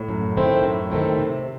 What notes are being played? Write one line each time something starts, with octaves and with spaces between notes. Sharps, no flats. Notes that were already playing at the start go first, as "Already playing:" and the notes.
Already playing: A2
F#2
D#3 A3 C4 E4
F#2
D#3 A3 C4 E4
C3